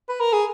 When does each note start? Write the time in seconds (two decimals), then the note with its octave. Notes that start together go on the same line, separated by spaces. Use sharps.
0.09 B4
0.21 A#4
0.33 G#4